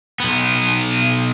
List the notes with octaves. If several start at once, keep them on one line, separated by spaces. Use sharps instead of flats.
B1 B3